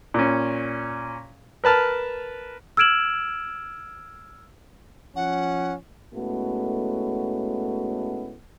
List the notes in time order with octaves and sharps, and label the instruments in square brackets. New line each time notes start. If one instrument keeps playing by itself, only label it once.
[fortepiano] A#2 C#4
A#4 B4 A5 F6
[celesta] E6 F6 G#6 D7 E7 F#7
[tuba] F3 [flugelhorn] C#4 [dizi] F#5
[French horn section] A2 G#3 A3 B3 C#4 F#4